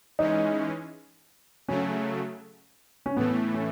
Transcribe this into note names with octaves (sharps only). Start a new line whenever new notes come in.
E3 G#3 C#4 D#4
C#3 F#3 A3 C#4
C#4
A2 E3 A3 B3
C#4